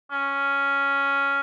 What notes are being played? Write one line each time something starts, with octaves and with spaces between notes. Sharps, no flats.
C#4